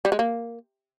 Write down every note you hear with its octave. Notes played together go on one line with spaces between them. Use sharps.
G3
G#3
A#3